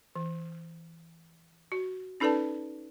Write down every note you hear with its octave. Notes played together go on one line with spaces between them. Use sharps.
E3
F#4
C#4 D#4 A4 B4 D5 A5